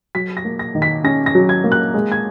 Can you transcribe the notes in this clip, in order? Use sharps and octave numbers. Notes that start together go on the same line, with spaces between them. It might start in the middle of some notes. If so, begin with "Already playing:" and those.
F#3 B6
A#6
A#3
A#6
D#3
B6
C#4 A#6
A#6
F#3
G#6
A#3
F#6
G#3
G#6